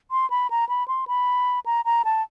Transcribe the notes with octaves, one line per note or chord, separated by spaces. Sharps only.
C6
B5
A#5
B5
C6
B5
A#5
A#5
A5